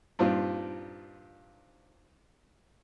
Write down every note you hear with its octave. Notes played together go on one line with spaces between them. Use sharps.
G2 A#2 C4 D#4 F4